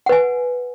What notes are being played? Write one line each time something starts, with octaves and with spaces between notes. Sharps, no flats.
B4 F#5 G#5